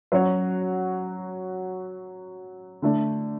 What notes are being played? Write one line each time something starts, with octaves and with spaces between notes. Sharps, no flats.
F#3 C#4 F#4 C#5
D3 A3 D4